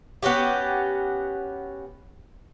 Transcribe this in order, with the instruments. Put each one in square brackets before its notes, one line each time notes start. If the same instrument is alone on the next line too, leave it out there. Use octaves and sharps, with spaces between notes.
[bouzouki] B3 C#4 F#4 G4